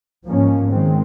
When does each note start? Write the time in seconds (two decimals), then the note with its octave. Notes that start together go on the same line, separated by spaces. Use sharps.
0.26 G#2 F3 A#3 C#4
0.71 D#3 G#3 C4